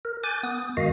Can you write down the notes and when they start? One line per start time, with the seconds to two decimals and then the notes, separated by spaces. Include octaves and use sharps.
0.05 A#4
0.23 G#5 D6 F#6 G6 A6
0.43 B3 D#6
0.77 F#2 D#3 G#3 F#4 D#5 F5